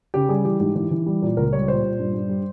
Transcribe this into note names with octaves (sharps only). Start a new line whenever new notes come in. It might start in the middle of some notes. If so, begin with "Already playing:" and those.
C#3 G4
G3 G#4
E3 G4
G#2 G4
E3 G4
E3
G3
A#2
C#2 A#4
G3 C#5
A#2 C5
A#2
G2
G2
G3